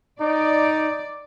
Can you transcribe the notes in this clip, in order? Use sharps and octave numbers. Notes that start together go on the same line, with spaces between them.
D#4 D5